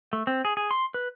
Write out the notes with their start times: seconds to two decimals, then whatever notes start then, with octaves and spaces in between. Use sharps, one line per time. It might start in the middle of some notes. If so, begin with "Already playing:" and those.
0.13 A3
0.27 C4
0.45 G#4
0.57 G#4
0.71 C6
0.94 B4